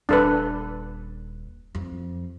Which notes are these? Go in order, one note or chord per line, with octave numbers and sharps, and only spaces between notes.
D#1 D4 A4 B4
F2